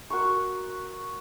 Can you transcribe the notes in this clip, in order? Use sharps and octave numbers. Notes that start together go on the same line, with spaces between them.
F#4 A#4 C6 C#6